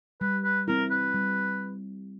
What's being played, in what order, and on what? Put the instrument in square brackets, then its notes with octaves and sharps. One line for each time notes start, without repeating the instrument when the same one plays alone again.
[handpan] G3 [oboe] B4
[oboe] B4
[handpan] C4 E4 [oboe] A#4
[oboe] B4
[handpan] G3